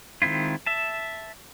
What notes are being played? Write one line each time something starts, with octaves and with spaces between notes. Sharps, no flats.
D#3 G#3 C4 E4 F4
E5 A5